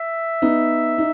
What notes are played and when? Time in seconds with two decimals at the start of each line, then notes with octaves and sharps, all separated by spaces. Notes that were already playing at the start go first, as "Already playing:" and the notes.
Already playing: E5
0.42 B3 D#4
0.98 D#4